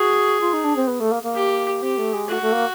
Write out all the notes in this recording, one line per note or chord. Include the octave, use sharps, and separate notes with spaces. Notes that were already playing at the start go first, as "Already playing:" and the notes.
Already playing: F#4 G#4
F4
D#4
D4
C4
B3
A3
A#3
A#3
G4
C4 G4
A3
G#3
A3 F#4
A3
A#3